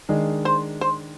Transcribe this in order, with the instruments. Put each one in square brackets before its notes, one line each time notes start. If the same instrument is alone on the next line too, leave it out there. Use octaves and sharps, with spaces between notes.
[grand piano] D#3 G#3 D4 G#4
[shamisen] C5
C5